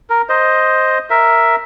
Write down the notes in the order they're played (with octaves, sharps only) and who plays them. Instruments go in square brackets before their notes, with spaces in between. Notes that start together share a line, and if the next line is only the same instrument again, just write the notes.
[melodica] A#4
C5 D#5
A#4 E5